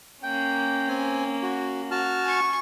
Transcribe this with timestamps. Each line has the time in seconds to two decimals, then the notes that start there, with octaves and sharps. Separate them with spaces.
0.23 A#3 C#4 G5
0.88 C4 G#5
1.42 F#4
1.91 F#4 A5 F6
2.24 G#5 C#6